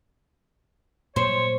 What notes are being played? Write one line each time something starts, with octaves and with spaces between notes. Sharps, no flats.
A#2 F#3 C5 C#5